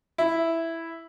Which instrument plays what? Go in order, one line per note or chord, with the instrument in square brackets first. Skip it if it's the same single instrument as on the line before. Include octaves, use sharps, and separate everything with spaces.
[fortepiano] E4